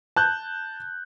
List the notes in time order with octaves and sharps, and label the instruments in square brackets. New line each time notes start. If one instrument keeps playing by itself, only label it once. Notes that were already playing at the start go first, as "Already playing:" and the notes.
[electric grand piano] A5 F#6 G6